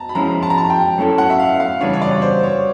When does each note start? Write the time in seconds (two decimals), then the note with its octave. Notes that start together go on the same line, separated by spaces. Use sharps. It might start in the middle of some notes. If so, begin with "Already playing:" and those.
Already playing: A5 A#5
0.09 B5
0.15 F3 G#3 C#4 E4 A#5
0.43 A5
0.50 A#5
0.58 A5
0.70 G5
0.98 F#3 A3 C#4 E4 A4
1.18 F#5
1.30 E5
1.39 F5
1.60 F5
1.81 C#3 E3 G3 B3 D4 C#5
1.93 C#5
2.02 D5
2.22 C5
2.43 C#5